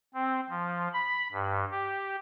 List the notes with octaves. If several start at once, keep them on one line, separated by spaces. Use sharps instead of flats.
C4
F3
B5
G2
G4